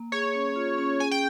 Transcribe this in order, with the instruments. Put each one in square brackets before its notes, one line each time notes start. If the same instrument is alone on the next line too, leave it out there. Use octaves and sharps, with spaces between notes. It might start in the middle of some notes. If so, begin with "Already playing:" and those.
Already playing: [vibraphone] A#3
[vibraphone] G#4 [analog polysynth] C#5
[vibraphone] C#4
F4
C#4
[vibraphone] G#4 [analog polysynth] G#5
[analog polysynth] G5